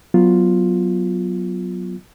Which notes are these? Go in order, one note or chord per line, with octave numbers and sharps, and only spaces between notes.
F#3 B3 F4